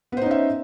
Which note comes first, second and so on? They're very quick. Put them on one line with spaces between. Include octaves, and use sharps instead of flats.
B3 C5 D#4 C#4 E5